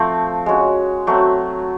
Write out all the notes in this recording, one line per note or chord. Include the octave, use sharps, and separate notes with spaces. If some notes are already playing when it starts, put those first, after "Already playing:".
Already playing: F3 A3 C4
G#3 C#4 F#4
F#3 A3 C4